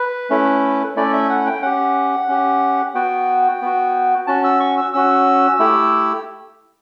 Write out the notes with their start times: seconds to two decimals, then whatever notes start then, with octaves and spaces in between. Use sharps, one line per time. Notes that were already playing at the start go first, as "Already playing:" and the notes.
Already playing: B4
0.30 A3 C#4 E4
0.96 A3 C#4 E4 D5
1.13 E5
1.29 F#5
1.47 G5
1.62 C#4 G4 F#5
2.29 C#4 G4
2.95 B3 F#4 G5
3.62 B3 F#4
4.27 C#4 F#4 A5
4.44 E6
4.60 C#6
4.78 E6
4.93 C#4 F#4 E6
5.59 A3 E4 G4